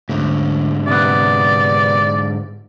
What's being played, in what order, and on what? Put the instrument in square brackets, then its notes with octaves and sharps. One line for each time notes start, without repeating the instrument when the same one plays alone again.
[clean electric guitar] D2 [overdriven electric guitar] G#2 D3
[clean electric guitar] C3 B3 [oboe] D5